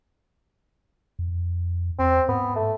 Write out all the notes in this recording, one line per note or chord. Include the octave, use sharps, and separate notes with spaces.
F2
E2 C4
G#2 B3
A3